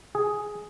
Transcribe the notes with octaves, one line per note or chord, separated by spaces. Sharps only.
G#4